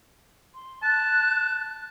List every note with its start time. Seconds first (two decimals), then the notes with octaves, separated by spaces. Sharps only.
0.54 C6
0.82 A5 F#6